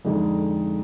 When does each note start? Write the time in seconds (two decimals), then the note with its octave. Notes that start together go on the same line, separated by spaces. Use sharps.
0.04 F2 D3 G#3 D#4